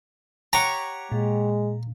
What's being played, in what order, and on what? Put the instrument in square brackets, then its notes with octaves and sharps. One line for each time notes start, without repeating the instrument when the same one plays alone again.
[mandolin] G4 C#5 F#5 [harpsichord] A#5
[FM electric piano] A#2 [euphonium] G#3